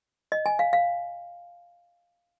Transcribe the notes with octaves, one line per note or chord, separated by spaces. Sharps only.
D#5
G#5
F5
F5